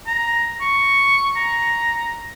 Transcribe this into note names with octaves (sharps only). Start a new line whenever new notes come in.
A#5
C#6
A#5